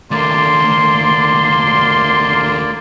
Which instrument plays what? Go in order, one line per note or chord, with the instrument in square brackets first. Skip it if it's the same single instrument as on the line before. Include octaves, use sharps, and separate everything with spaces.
[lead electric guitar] D#2 A3 [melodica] A#3 D5 [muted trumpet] C6